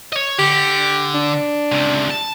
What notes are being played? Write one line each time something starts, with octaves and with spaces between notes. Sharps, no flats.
C#5 D#5
D3 G4
D4
C#2 C3
A5